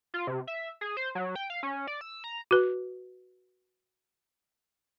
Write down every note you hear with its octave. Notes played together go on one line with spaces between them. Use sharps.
F4
C3
E5
G#4
C5
F#3
G5
F5
C#4
D5
E6
A#5
F#4 B4